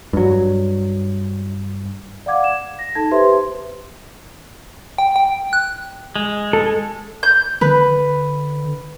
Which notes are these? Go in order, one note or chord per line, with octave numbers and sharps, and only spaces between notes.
G2 F#3
D5 F5 F#5 D6 G#6
E7
A#6
D#4 A4 A5 G#6
G4 B4 C5 E5 C6
G5
G5
F#6
G#3
A4
G6
D3 B4